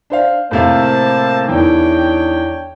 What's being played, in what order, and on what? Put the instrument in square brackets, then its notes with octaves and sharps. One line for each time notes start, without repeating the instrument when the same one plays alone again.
[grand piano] D4 C5 F5
[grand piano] A2 C3 F5 [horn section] A#3 C5 A5
[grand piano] E2 D#3 E3 [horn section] D4 C#5 G5